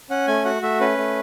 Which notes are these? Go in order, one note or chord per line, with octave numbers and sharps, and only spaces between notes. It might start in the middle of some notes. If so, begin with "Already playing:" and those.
C#4 F#5
A3 G#5
F#4 F#5
A3 E5
C#4 B4
A3